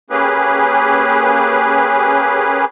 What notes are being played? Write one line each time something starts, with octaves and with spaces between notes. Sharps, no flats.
A#3 C#4 G4 G#4 B4